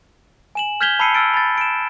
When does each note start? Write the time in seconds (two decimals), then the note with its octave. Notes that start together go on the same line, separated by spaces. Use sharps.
0.55 G#5 E7 F#7
0.81 F6 G6 G#6 B6 F7 G7
0.99 A5 B5 E6 C7 C#7 D#7
1.15 E6 F6 A6 D7
1.34 B5 A6
1.58 D7 E7